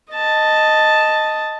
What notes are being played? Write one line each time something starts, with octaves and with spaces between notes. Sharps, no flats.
D#5 A5